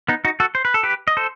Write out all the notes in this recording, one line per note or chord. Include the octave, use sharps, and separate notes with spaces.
B3 D#4
D#4 F#4
F#4 A4
C5
B4
A4
G4 B4
D#5
A4 C5